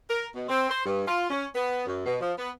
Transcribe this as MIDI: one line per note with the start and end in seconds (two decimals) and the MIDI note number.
0.09 0.27 70
0.35 0.48 47
0.49 0.66 60
0.69 0.83 72
0.85 1.02 43
1.07 1.27 65
1.30 1.46 61
1.55 1.84 59
1.86 2.03 42
2.06 2.16 47
2.21 2.33 53
2.38 2.51 59